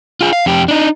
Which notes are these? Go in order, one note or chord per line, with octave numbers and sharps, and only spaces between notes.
F4 G#4
F5
F2 G4
D4 D#4